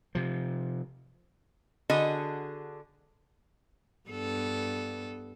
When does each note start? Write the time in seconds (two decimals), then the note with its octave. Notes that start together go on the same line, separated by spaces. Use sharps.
0.15 C3 F3
1.90 D3 F#4 G#4 D#5
4.09 G2 B3 A4